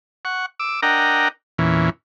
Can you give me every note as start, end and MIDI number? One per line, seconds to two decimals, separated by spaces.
0.25 0.46 78
0.25 0.46 85
0.59 0.81 86
0.59 0.81 88
0.82 1.28 62
0.82 1.28 70
0.82 1.28 75
0.82 1.28 78
0.82 1.28 79
0.82 1.28 82
1.59 1.90 40
1.59 1.90 46
1.59 1.90 52
1.59 1.90 61